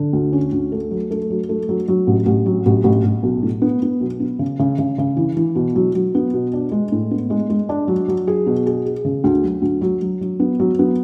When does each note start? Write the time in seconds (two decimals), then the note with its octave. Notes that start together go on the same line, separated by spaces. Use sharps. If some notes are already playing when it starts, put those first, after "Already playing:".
Already playing: D3
0.13 D2
0.33 C#4
0.52 D2
0.72 A3
0.91 F#3
1.11 A3
1.30 F#3
1.49 A3
1.69 F#3
1.88 F#3
2.07 A1
2.26 A1
2.46 F#3
2.66 A1
2.84 A1
3.04 A1
3.23 B1
3.42 A2
3.62 B3
3.82 B3
4.01 B1
4.20 B3
4.39 C#3
4.59 C#3
4.79 C#3
4.98 C#3
5.17 E3
5.37 E3
5.55 B2
5.76 F#3
5.95 F#3
6.15 B3
6.34 B2
6.53 D4
6.71 G#3
6.92 A2
7.11 B3
7.30 G#3
7.50 G#3
7.69 D4
7.88 F#3
8.08 F#3
8.27 G#4
8.46 B2
8.66 G#4
8.86 G#4
9.05 C#3
9.24 D2
9.44 F#3
9.62 D2
9.81 F#3
10.02 F#3
10.21 F#3
10.40 B3
10.60 F#3
10.79 B3